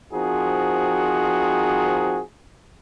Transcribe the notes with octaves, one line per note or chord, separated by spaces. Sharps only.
F3 C4 D#4 F#4 G#4 A#4